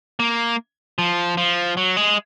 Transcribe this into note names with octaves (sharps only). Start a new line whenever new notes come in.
A#3
F3
F3
F#3
G#3